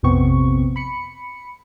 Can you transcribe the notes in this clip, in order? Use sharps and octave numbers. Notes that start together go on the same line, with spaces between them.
A#1 F2 C3 B3 C4 C#6
B5 C#7